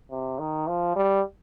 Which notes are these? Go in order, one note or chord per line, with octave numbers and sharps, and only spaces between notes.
C3
D#3
F3
G3